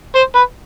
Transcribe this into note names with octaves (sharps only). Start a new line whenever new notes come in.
C5
B4